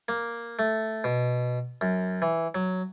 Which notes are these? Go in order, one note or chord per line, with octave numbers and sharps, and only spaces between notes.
A#3
A3
B2
F#2
E3
F#3